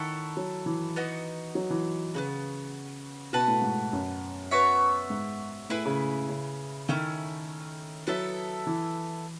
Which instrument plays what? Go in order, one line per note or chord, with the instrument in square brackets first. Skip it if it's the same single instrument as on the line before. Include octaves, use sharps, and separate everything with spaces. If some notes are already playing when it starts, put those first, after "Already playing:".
Already playing: [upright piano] D#3 [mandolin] E4 A4 C#5 F#5
[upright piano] F#3
E3
[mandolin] B3 D#4 F#4
[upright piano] F#3
E3
[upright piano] C#3 [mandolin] B3 D#4 F#4
[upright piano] B2 [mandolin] F#4 B4 F#5 A5
[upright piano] A2
G#2
F#2
[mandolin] B3 F#4 C#5 E5
[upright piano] G#2
[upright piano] A2 [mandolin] E4 G#4 B4
[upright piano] C#3
C#3
[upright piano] D#3 [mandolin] A3 C#4 E4
[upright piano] F#3 [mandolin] B3 E4 A4 E5
[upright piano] E3